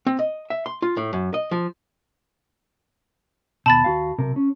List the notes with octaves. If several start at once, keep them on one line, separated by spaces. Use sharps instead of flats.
C4
D#5
E5
C6
F4
A2
F#2
D#5
F3
D#2 B2 A5 B5 A6
D#2 F#4 F5
B1 C3 A#4
C#4